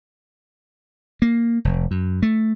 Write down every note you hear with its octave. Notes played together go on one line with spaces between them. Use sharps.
A#3
F1
F#2
A3